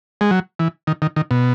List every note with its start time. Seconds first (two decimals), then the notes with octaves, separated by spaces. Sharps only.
0.21 G#3
0.31 F#3
0.59 E3
0.87 D#3
1.02 D#3
1.16 D#3
1.31 B2